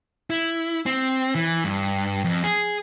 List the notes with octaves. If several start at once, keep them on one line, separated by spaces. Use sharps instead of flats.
E4
C4
E3
G2
F2
G#4